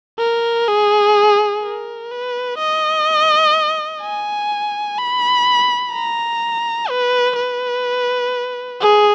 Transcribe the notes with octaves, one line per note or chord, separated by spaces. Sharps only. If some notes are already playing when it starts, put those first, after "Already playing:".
A#4
G#4
A#4
B4
D#5
G#5
B5
A#5
B4
B4
G#4